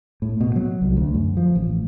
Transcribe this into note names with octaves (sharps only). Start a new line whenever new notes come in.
A2
B2
F#3
C2
D2
F#2
F3
A1